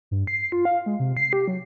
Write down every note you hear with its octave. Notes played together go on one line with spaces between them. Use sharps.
G2
C7
F4
F5
G#3
C3
C7
G4
F#3